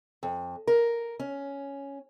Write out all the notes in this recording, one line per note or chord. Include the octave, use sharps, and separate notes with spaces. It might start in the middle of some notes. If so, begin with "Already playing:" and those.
F2
A#4
C#4